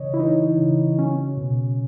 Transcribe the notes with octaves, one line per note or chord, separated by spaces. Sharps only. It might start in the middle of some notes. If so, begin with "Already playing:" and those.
Already playing: C#3 E3 C#5 D#5
E4
E3 D#4
C#3
F#3 C#4
B2